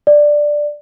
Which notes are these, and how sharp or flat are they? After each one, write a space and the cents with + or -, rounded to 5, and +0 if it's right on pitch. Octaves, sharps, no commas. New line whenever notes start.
D5 +5